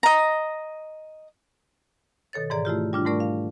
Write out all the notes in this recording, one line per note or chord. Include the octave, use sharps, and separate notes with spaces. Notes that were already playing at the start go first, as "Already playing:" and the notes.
D#5 A#5
B2 D#3 A4 C#5 A6
G#2 E3 G#4 D5 A#5
A3 E4 F4 G4
G3 D4 F4
G#2 A3 A#4 D5 C#6
F5